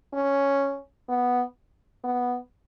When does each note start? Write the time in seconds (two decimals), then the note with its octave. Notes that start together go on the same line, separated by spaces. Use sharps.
0.13 C#4
1.09 B3
2.04 B3